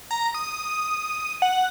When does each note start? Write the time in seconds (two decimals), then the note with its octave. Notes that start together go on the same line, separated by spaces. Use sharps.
0.11 A#5
0.34 D#6
1.42 F#5